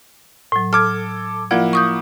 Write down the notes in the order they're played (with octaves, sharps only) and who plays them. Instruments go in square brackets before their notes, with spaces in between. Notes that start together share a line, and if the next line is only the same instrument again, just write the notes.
[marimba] A2 F#3
[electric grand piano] A4 D6 G#6 [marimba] F6
[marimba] F3 F4 D5 [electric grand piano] A#3 E4 F#5
[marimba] C#6 D#6 G6